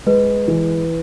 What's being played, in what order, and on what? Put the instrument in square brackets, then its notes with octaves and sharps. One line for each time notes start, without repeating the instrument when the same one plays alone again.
[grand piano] G#3 [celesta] B4
[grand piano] E3